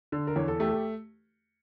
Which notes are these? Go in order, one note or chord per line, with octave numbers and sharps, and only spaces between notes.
D3
A#4
E2 C#5
A4
A3 G4
A4
G4